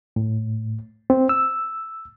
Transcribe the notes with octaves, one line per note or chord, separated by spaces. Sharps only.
A2
C4
E6